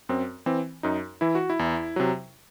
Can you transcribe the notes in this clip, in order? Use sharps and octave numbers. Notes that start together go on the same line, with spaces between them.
F#2 C4
E3 C4
F#2 D#4
E3 E4
F#4
E4
E2
C3 F#3